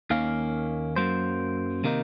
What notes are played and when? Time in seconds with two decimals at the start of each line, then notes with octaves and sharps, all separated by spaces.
0.10 D#2 D#3 A#3 C#4 F5
0.96 F#2 C#3 F#3 A#3 C5
1.84 C3 D#3 A#3 D#4